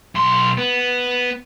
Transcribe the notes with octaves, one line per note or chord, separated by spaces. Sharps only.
B1 C6
B3